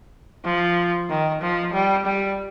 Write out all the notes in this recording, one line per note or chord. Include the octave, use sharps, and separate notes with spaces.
F3
D#3
F3
G3
G3